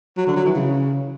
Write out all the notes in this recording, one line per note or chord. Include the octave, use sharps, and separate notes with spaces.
F#3
D3
F#3
E3
C#3